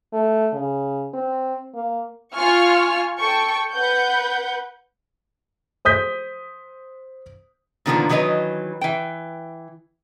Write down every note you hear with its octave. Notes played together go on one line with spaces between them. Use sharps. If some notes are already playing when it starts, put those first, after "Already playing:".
A3
C#3
C4
A#3
F4 G#5 C#6 F6
A4 G5 C#6
B4 F#5 G6
C5 D#6 G6 B6
A#2 D3 D#3 F3 A#3 B3
D#3 E3 F#3 B4 D#5
E3 G5